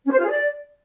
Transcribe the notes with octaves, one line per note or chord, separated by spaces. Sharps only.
C#4
C5
F4
G#4
D5